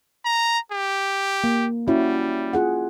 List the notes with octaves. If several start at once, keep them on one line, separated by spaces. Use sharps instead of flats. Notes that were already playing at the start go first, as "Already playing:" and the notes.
A#5
G4
A#3
G3 C#4 E4 F#4
F4 G#4 F#5